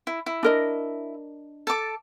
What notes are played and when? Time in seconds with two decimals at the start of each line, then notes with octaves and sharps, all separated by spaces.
0.07 E4
0.26 E4
0.43 D4 A#4 D#5
1.67 A4 A5 D6